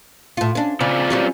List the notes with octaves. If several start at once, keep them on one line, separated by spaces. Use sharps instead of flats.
A2 F4
C#4 D4
C#3 C4 F4 D5
F#3 G3 C#4